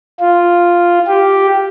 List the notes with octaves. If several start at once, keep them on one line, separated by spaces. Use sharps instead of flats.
F4
G4